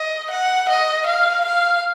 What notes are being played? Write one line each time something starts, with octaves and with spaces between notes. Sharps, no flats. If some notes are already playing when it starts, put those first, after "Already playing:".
Already playing: D#5
F#5
D#5
F5
F5